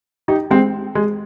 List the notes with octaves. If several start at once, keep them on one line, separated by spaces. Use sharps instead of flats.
D#4 G4
G#3 C4
G#3